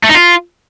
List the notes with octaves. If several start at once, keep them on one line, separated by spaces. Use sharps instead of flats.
A3
D#4
F4